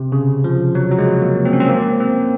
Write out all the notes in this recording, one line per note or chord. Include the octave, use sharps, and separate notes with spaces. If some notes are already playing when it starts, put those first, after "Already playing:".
Already playing: C3
C#3
F3
F#3
F#3
G#3
A#3
C4
C#4
C4
A#3
C4